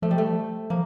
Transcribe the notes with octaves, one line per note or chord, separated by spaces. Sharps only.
F3 A3
G3
A3
F3 A#3